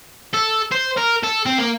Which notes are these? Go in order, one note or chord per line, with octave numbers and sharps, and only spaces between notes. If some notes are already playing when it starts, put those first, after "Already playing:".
A4
C5
A#4
A4
C4
A#3